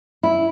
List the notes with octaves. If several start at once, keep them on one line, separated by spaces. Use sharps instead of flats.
E4